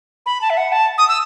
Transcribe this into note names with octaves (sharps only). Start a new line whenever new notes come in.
B5
A5
E5
F#5
A5
D#6
E6